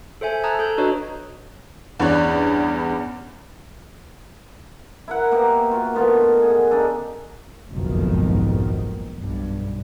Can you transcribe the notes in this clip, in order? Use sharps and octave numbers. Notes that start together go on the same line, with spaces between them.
A4 C5 E5 G#5
A5 A#5 D#6 E6 F#6 G#6
A4 D#6 G6
D4 F#4 B4 C#5 D#5 A#5
E2 G2 C#4 C#5 D5 F#6
E4 A#4 F#5
A#3 B3 G4 A#4
F4 F#4 A#4
D#3 A3 B3 F4
G#4 F#5
C#3 D4 D#4 A4
F#1 B1 F2 G#2 B2 D#3
B1 G2